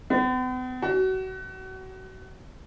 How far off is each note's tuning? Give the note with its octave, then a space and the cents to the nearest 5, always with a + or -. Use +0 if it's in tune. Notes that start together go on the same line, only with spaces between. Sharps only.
B3 +45
F#4 +30